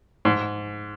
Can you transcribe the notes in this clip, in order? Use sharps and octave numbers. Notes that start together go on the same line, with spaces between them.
G#2